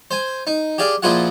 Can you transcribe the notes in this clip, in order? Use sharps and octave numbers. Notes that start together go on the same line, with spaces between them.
C5 G#5
D#4
G4 G#4 D5 F5
A#2 F3 E4 F4 G#4 F#5